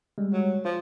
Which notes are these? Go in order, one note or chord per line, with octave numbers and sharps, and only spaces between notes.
G3 G#3
F#3
F3 F4